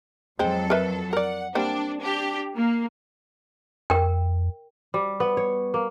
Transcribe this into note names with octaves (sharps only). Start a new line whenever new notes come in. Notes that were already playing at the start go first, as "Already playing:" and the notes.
F2 F#3 G#3 C4 A4
A#4 B4 E5
A#4 D5 F#5
G3 A#3 C4 D4
D4 G4
A#3
F2 A#4 G5
G3
B3
C#5
A#3